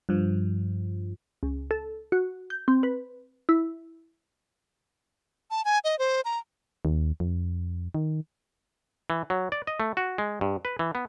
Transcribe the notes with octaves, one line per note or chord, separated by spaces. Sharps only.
G2 F3
C#2
A4
F#4
G6
C4
B4
E4
A5
G#5
D#5
C5
A#5
D#2
F2
D#3
E3
F#3
D5
D#5
A3
F#4
G#3
G2
B4
E3
B3